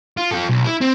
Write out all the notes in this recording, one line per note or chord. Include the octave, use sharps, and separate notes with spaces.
F4
F4 A4
B1
E4
C4